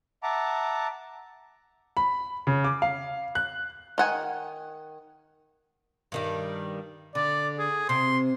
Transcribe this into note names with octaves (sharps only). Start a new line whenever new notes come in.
E5 F#5 A5 A#5 D6
B5
C#3
D6
F5
F#6
D#3 F#5 G#5
G2 D#3 G3
D3 D5
G#4
C3 C6